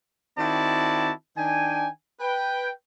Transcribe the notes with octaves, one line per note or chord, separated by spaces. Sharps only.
D#3 C4 E4 F#4 D5 A5
D#3 D4 G5 G#5
B4 G5